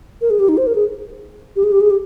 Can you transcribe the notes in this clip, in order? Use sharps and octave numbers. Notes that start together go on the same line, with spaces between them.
A#4
G#4
G4
D#4
C5
A#4
G#4
G4
G#4
G4
G#4
G4